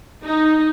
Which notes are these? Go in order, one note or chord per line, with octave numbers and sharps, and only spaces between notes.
D#4